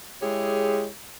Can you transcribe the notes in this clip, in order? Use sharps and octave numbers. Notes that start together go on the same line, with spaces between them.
G#3 E4 G4 G#4 C#5